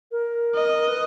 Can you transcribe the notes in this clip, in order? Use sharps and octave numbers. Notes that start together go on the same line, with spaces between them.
A#4
D#5
B4